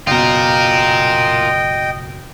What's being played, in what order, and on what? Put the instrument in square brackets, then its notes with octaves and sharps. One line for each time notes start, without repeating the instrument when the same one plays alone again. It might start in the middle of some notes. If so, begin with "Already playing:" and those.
[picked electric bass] F#1 B2 [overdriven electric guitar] F4 A#4 [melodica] D#5 G5